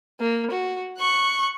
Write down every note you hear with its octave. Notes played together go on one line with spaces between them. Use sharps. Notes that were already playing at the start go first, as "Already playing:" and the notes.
A#3
F#4
C#6 F#6